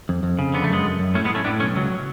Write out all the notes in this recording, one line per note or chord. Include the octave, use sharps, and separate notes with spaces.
F2
F2
C#3
D3 B3
A3
F#2 G#3 B3
F#2
F#2
A2 A3 C#4
G#3 B3
A2
A3 C#4
A2 B3 D4
B1 A3 C#4
C#2 F#3